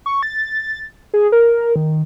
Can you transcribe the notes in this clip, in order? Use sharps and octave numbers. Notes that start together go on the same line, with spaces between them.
C#6
A6
G#4
A#4
D#3